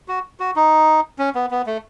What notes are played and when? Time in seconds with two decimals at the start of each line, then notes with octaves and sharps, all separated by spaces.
0.08 F#4
0.40 F#4
0.56 D#4
1.19 C#4
1.35 B3
1.51 B3
1.66 A3